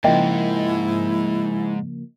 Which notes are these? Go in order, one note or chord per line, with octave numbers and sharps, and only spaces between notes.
G#2 C#3 F3 A#3 E4 D#5 E5 G5